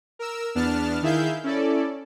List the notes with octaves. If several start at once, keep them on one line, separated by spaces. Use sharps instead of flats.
A#4 E6
E2 B3 D4 A5 F6
D#3 E4 G#4 E5 F5 G6
C#4 E4 A4 D5